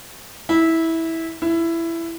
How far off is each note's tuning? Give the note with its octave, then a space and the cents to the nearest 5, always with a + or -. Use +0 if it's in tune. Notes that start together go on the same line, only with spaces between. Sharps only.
E4 -15
E4 +15